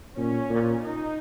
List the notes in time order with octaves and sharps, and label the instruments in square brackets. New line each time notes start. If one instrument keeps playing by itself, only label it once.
[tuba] A#2 [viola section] C#4
[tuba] A#2
[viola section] D#4